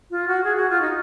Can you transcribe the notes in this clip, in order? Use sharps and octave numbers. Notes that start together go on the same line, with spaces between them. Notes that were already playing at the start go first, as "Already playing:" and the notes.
F4
F#4
G#4
F#4
F4
D#4